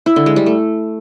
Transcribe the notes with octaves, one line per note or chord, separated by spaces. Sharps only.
E4
D3
G#3
G3
A3